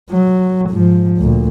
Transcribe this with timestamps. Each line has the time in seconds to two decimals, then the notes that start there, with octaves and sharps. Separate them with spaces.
0.11 F#3
0.70 G#2 F3
1.18 D2 A#2